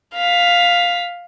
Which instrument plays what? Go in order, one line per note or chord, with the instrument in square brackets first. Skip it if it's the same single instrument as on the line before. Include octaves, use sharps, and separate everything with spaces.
[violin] F5 B6